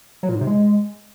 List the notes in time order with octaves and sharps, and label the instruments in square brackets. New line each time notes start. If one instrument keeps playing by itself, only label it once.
[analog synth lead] F#3
A#2
G#2
C3
G#3